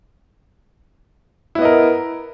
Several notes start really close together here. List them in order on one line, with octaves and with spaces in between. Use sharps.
E4 B3 D#5 A#4